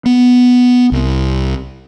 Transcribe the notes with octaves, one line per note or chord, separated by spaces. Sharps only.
B3
C2